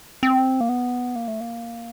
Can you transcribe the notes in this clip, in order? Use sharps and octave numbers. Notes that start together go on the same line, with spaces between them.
C4
A#3
B3
A#3
A3
A#3